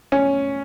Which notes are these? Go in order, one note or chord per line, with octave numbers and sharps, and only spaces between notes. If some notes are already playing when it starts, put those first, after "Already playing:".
C#4